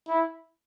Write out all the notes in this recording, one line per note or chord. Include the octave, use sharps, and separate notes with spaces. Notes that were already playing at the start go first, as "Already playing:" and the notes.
E4